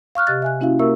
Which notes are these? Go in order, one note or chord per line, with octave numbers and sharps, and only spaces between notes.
F5 C#6 F6 F#6
C3 G4 D#5 F#6 A6
E5 G#5 F#6
A#3 C#4 E4 F#4 E5 F5
A#3 G4 A#4 E5 C#6 E6